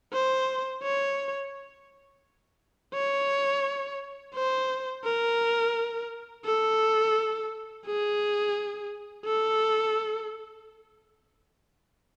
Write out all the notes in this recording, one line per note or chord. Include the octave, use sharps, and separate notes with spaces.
C5
C#5
C#5
C5
A#4
A4
G#4
A4